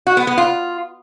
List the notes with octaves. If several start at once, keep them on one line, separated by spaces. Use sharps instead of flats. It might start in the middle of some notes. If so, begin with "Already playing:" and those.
F#4
B3
B3
F4